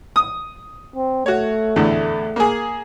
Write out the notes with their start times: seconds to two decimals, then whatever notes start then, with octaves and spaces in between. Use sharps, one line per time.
0.16 D#6
0.96 C4
1.26 A3 F#4 C#5
1.76 E2 A2 D3
2.36 A#3 G#4